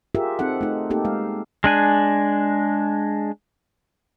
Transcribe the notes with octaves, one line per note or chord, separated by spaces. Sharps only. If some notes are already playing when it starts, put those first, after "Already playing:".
F4 G4 G#4 A#4 E5
C4 D#4 A4 F#5
A3 D#4
A#3 C4 D#4 G4 A4
G#3 F5
G#3 D4 G#5